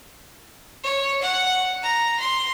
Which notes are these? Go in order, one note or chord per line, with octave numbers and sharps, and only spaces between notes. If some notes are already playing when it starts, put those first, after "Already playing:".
C#5
F#5
A#5
C6